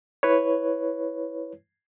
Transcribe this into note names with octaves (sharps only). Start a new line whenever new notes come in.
E4 B4 C#5